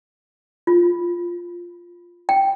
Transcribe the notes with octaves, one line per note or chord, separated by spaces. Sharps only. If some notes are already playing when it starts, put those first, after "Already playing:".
F4
G5